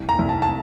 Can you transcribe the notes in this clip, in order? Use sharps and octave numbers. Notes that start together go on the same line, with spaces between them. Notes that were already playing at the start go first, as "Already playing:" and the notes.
Already playing: C2
A#5
C2
A5
A5